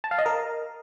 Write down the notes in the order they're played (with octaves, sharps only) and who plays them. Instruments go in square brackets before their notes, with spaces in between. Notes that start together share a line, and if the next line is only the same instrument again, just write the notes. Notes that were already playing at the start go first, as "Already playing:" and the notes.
[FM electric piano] A5
F5
D#5
A#4